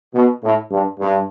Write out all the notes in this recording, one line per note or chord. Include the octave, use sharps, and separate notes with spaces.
B2
A2
G2
G2